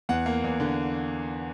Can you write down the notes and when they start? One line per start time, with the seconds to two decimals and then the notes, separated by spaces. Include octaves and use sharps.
0.09 E2 F#5
0.26 A#3
0.44 E2
0.60 D3